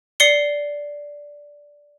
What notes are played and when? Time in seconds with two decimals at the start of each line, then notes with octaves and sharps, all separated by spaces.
0.20 D5 C7 C#7 G7